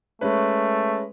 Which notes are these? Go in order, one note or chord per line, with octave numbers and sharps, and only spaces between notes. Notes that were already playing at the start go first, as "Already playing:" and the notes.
G#3 A3 C#4 B4